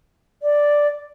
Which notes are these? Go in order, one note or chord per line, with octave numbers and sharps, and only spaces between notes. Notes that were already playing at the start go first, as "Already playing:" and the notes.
D5